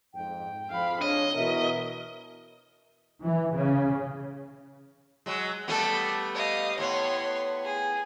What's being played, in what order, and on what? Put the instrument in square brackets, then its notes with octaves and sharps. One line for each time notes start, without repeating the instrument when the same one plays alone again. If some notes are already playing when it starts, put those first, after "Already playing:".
[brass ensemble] F2 G#2 [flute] G5
[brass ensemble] F2 G#2 F3 [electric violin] F5 B5
[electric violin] D4 [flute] C#5 [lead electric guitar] D#5
[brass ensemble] B2 E3 [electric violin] A#4 [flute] E5
[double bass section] E3
C#3
[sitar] F#3 G#3
[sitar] G3 A3 B3 [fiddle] A4
[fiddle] D#5 F5
[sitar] A2 B3 [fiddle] C#5 C6
[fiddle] G#4